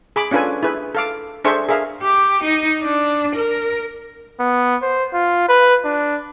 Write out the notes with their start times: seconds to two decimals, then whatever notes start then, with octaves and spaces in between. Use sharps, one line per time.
0.16 G#4 B5 D6
0.31 C#4 D4 F4 A4 B4 G#5
0.63 E4 G#4 B4
0.95 A4 F5 D6
1.44 D4 G#4 A4 C5 E5 C#6
1.68 G#4 A#4 E5 F5
2.03 G4
2.43 D#4
2.82 D4
3.35 A#4
4.40 B3
4.82 C5
5.13 F4
5.49 B4
5.85 D4